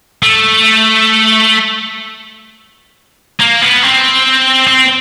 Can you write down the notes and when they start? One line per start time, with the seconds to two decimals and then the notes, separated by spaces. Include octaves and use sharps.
0.23 A3
3.40 A#3
3.62 B3
3.83 C4
4.67 C4